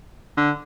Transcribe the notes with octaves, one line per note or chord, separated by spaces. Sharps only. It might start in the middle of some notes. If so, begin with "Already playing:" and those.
D3